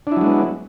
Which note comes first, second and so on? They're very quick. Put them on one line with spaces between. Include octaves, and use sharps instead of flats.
D4 E4 F#3 G#3 B3